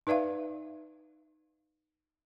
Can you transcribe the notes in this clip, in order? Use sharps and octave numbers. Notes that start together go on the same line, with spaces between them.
D#4 B4 D5 E5 F5